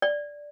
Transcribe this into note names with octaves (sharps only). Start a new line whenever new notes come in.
D5